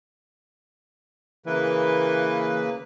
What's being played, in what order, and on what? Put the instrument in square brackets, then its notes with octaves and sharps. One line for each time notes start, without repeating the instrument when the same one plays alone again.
[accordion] C#3 A#3 B4 [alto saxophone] E3